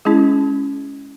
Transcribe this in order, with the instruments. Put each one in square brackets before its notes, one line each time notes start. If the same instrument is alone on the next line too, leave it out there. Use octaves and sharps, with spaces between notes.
[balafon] G#3 C#4 E4 G#4